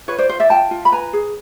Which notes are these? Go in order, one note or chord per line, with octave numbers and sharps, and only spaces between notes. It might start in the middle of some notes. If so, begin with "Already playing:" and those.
F4 B4 C#5
C5 D5
F4 C5
D5 E5
F4 G5 A5
F4
B5
B4 G#5 A#5
G#4